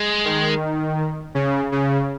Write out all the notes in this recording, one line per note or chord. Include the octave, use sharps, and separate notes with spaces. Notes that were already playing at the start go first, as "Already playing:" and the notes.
Already playing: G#3
D#3
C#3
C#3